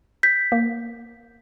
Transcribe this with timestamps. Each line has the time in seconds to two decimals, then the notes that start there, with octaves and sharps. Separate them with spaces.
0.23 G6 B6
0.52 A#3